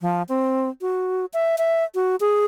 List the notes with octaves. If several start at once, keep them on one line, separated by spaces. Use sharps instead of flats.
F3
C4
F#4
E5
E5
F#4
G#4